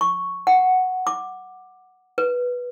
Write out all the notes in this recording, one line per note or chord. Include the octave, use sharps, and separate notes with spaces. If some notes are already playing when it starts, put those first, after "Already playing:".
C#6
F#5
D6
B4